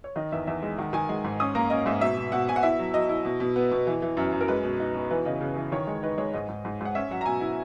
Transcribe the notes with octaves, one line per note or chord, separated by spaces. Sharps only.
C#5
D#3 D#5
E2 E5
E2 E5
G#3
D#3 F#5
D#3 G#5
G#3 F#5
G#2
C#4 D#6
A#3 A#5
C#4 D#5
G#2 E5
B2 E5
B2
B2 F#5
B2 G#5
F#5
E4 E5
F#3
F#3 D#5
E4
B2
B2
B3
B2
E3
E3
F#2
F#2
A#4
G#3 B4
B2
D#4
B2
E3 B4
C#3 D#5
C#3
E3
D#3 C#5
G#3
D#4 B4
G#3 C#5
G#2 D#5
G#2
G#2
G#2 F#5
C#4 E5
F#3 F#5
A#5
B2 G#5
E4